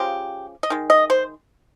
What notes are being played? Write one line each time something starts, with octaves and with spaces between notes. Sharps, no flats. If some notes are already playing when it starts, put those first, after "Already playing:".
Already playing: C#3 F3 G#3 G4
D#5
D#3 G#3
D#5
C5